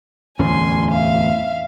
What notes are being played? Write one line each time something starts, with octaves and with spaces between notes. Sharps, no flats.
D1 E2 C#4 G#5 C6
E5 F5